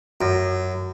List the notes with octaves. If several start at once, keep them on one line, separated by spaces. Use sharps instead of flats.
F#2